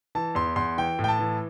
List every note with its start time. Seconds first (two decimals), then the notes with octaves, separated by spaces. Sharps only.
0.15 E3 A5
0.35 E2 C6
0.56 E2 C6
0.78 E3 G5
0.99 A2
1.04 G5
1.08 A5
1.19 E3